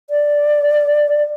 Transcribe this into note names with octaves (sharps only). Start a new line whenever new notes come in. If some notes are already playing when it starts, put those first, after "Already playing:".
D5